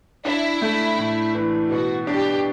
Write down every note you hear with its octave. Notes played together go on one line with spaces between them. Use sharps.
D4 E4
A3
A2
E3
B2 F#4
D4 G4